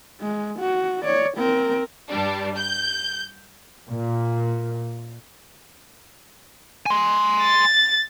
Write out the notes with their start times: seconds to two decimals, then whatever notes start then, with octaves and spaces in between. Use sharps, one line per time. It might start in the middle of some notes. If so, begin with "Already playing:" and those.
0.21 G#3
0.59 F#4
1.02 C#5 D5
1.37 C4 A#4
2.10 G2 G3 D4
2.57 G6
3.89 A#2
6.86 G#5 C6
7.42 A6